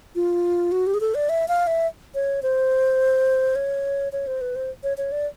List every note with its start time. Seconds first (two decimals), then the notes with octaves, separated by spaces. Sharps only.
0.15 F4
0.72 F#4
0.87 G4
0.94 G#4
1.00 A4
1.15 D5
1.29 E5
1.48 F5
1.67 E5
2.15 C#5
2.43 C5
3.56 C#5
4.12 C#5
4.27 C5
4.41 B4
4.56 C5
4.83 C#5
4.98 C#5
5.12 D5